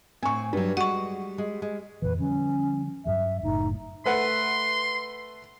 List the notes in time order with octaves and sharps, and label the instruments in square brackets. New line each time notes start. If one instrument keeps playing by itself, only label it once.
[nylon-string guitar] A2 C4 [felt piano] G#5 C#6
[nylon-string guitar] G2 F#3 [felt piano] G3
[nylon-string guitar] G#3 F#4 [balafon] F#5 C#6
[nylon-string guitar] G#3
G#3
[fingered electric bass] F2 A#2 E3 [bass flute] B4
[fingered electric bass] D3 F3 G3 [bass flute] C#4
[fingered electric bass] G2 F#3 G3 [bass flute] E5
[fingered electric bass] F#1 A2 [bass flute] D#4
[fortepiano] A3 B4 F#5 [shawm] C6